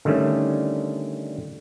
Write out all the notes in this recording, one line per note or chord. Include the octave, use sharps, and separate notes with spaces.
D3 D#3 G3 A3 C#4